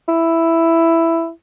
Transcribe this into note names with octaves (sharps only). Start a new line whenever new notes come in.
E4